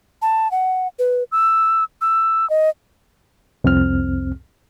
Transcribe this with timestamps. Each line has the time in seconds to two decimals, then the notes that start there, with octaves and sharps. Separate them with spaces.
0.22 A5
0.51 F#5
0.99 B4
1.32 E6
2.01 E6
2.50 D#5
3.64 C2 F2 C4 F6